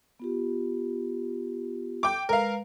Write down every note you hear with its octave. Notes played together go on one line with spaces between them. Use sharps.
B3 F4 G4
G5 D6
G#3 A#4 B4 F5